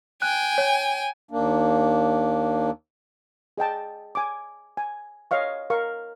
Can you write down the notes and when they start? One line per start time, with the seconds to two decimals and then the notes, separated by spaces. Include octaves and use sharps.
0.22 G5 G#5 F#6
0.58 C#5
1.31 D#2 A#3 D4
3.58 G#4 D#5 G5 A5
4.15 G#5 D6
4.77 G#5
5.31 C#5 D#5 F5 C#6
5.70 A#4 F5 C#6